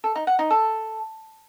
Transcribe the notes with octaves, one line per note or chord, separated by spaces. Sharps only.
A4
D#4
F#5
D#4
A4